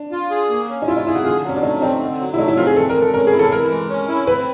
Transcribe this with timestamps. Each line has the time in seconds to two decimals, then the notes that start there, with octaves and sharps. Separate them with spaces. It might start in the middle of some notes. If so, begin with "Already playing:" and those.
Already playing: D4
0.12 F4
0.31 G#4
0.50 A#3
0.69 C#4
0.82 D#4
0.87 E4 F4
0.97 D#4
1.07 E4 G#4
1.15 F#4
1.25 D3 F4
1.44 F#3
1.49 C#4
1.56 D4
1.63 A3 D#4
1.81 C4 D#4
2.00 D3
2.20 F#3
2.34 E4
2.38 A3 D#4
2.48 E4
2.57 C4 F4
2.67 G#4
2.76 E3 A4
2.89 A#4
2.95 G#3
3.02 A4
3.14 C#4 A#4
3.27 G#4
3.32 E4
3.39 A4
3.52 E3 A#4
3.70 G#3
3.89 C#4
4.08 E4
4.27 C4 B4